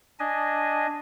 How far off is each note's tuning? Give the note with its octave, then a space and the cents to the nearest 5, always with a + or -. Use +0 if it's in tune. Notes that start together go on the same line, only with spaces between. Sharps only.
D4 +0 D#5 +0 G#5 +0